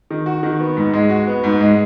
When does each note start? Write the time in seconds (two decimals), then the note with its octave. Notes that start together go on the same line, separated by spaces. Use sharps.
0.10 D#3
0.26 F#4
0.43 D#3
0.60 B3
0.77 G#2
0.93 G#3
1.09 F#4
1.27 B3
1.44 G#2
1.61 G#3